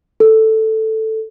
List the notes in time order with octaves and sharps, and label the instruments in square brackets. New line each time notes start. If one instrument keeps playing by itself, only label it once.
[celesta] A4